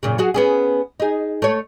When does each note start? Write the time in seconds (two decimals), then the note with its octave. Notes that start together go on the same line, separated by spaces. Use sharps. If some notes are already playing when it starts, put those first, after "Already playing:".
0.03 F#2 A#2 C#3
0.18 F#3 F#4 G#4
0.34 B3 C#4 G#4
1.00 D#4 G#4
1.42 A3 C#5